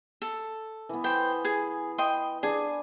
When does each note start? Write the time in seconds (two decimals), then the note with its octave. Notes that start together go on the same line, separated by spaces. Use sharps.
0.22 A4
0.89 E3 B3
1.04 B3 C5 G5
1.45 G#4
1.98 D#5 G5 C6
2.43 D4 G#4 G#5